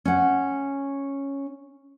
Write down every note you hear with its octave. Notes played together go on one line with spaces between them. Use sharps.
C#4 F#5